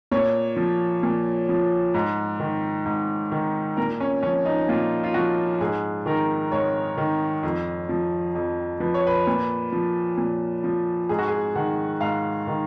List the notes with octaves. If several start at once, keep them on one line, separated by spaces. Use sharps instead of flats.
A#2 C#5
F3
A#2
F3
G#2
D#3
G#2
D#3
A#2 A#4
C#4
F3 C#4
D#4
A#2 F4
F4
F3 F#4
G#2 G#4
D#3 A#4
G#2 C#5
D#3
F2
F3
F2
F3 B4
C#5
B4
A#2
F3
A#2
F3
G#2 G#4
F#4
G#4
D#3 F#5
G#2 F5
D#3